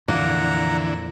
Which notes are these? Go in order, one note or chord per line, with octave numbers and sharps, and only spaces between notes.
F2 A#2 D3 E3 A#3 F#5 A#5